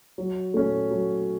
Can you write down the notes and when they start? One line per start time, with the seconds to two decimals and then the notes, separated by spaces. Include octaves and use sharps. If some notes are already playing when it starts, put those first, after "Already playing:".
0.18 F#3
0.54 A3 C#4
0.91 F#3